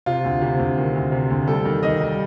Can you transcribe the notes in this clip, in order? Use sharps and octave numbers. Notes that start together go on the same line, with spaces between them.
C3 F4
D2
C3
D2
D#3
D2
C3
D2
G3 A4
D#3
D#3 D#5
G3